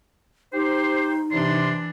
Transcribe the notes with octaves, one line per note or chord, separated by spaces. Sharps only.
D#4 G4 C5
C3 E3 D4 C6